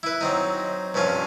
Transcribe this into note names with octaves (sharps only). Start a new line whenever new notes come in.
E4 B4
F#3 C4 D#4
G2 C3 F3 C#4 F4